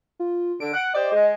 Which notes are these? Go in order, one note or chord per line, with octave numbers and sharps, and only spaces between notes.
F4
D3 D7
F#5
G4 C5 D5 D#5
G#3